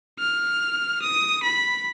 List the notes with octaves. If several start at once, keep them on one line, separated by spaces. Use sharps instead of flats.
F6
D#6
B5